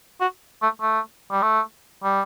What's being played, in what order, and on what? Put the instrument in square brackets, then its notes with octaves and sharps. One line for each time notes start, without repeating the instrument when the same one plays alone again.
[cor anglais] F#4
A3
A3
G3
A3
G3